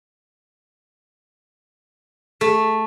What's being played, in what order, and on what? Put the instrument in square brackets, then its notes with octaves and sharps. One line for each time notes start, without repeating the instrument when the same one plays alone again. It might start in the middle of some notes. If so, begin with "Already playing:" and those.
[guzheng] A3